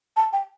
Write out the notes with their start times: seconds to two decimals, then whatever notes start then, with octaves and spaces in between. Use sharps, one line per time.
0.16 A5
0.33 G5